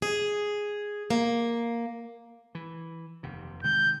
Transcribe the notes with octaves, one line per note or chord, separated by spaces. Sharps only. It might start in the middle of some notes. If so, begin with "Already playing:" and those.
G#4
A#3
E3
F1 D#2 C3
C3 D#3 G#3 G6